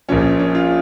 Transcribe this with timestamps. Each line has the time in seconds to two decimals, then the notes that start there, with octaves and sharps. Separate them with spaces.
0.09 A#1 A#2 F3 C#4
0.39 C#4
0.55 F4